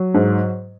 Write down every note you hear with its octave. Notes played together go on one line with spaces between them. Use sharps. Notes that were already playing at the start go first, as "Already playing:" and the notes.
Already playing: F#3
G#2